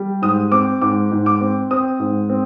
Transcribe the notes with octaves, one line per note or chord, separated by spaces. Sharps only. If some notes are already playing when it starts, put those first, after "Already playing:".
Already playing: G3
G#2 D#6
C4 D6
G#2 D6
G#2
D6
C4
C4 D#6
G#2
C4